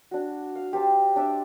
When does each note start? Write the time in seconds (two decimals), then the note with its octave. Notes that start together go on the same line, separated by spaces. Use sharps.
0.11 D4 F#4
0.55 F5
0.73 G4 C5 A5
1.16 D4 D5 E5